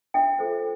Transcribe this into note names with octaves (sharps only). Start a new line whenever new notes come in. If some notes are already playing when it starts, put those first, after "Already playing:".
D4 E5 G5
F4 A4 C5